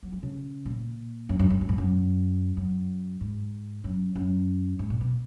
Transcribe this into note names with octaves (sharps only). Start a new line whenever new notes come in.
F#3
F3
C#3
A#2
F#2
F#2
F2
F#2
G#2
F#2
F#2
G#2
F#2
F#2
G#2
A#2
B2